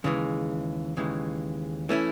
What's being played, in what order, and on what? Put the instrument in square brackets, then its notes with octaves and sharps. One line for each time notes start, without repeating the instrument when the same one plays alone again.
[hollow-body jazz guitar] D#2 C#3 E3 G#3
D#2 C#3 E3 G#3
E3 A3 C#4 E4